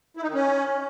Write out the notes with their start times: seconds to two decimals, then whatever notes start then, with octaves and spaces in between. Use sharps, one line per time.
0.17 E4
0.23 D#4
0.28 D#3
0.34 C#4